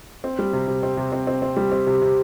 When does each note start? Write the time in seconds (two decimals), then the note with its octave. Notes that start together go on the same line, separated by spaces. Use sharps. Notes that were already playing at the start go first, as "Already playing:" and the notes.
0.24 C4
0.39 G3
0.53 C3
0.68 C3
0.83 C4
0.97 C3
1.12 C4
1.27 C4
1.42 C4
1.56 G3
1.72 C4
1.87 C3
2.02 C3